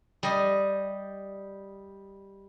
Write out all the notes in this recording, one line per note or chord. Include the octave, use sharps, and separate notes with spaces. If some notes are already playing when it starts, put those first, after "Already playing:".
G3 D#5